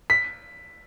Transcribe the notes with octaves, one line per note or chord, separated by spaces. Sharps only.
B6